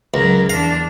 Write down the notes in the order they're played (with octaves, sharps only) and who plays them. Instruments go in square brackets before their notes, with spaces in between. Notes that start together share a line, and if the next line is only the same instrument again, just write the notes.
[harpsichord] C#2 [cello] F#3 A#4
[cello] E2 D4 [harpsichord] F5